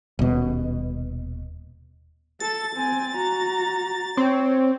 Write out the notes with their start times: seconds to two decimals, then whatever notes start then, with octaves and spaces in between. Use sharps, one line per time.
0.19 D#1 B2
2.40 A4 A6
2.76 C4 G#5
3.17 F#4 A#5
4.17 C4 C#5